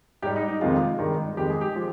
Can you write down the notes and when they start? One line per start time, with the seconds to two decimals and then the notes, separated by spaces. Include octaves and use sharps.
0.22 G#2 G3 G4
0.36 D#4
0.48 D#4
0.61 F2 C3 D#3 G#3 F4
0.99 G2 D#3 G#3
1.37 F2 D#3 G#3 G4
1.50 G#4
1.61 G4
1.75 F3 G#3